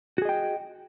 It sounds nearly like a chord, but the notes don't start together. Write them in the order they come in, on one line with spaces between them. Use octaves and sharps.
F#4 G#4 D#5 G5